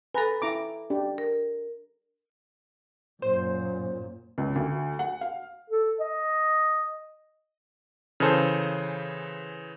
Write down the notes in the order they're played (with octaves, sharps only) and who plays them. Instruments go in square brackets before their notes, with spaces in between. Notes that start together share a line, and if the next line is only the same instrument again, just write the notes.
[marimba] A4 G#5 [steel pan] B4 A#5
[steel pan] E4 A#5 D6
D4 G4
[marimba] A#4
[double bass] F#2 A#2 [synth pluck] C5
[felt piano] C#2
D2
F#5
F5
[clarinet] A4
D#5
[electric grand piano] C#3 E3 G#4 A4 C5